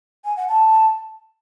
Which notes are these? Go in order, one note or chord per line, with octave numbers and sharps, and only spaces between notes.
G#5
F#5
A5